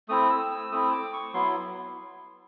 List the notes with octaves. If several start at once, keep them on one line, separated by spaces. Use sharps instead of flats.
A3 C4 E4 D#6
E6
E6
A3 C4 E4 D#6
D6
C#6
F#3 B3 E4 C6